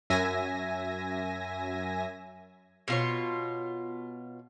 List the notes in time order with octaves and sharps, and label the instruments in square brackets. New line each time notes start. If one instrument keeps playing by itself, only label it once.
[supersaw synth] F#2 E5 G#5 A#6
[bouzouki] B2 F4 C#5